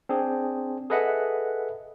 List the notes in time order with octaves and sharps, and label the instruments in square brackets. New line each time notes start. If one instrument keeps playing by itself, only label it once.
[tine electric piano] C4 D4 G#4
G#4 A4 B4 D#5 E5 F#5